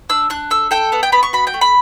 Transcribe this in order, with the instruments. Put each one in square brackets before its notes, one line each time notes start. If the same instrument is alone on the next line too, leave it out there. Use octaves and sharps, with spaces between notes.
[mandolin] D4 E6
D4 F#6
A4 E6
A4 G5
B3 F#5
G5
B3 B5
C#6
F#4 B5
G5
A3
B5